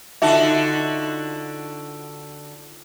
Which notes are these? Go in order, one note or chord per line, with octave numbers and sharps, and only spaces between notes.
D3 D#4 F4 F#4 E5 A5